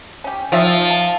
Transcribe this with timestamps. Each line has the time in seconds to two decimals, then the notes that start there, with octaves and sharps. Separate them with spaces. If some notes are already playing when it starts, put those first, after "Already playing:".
0.24 C#4 G4
0.52 D#3 F3 D5 E5
0.90 A5